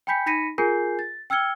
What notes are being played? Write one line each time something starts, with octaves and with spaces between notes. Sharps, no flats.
G5 G#5 B5 G6 B6 C#7
D#4 B5 A#6 B6 C#7 D#7
F4 G#4 A#4 G#5 G6 C7
A6
G5 E6 F6 G#6 C#7 G7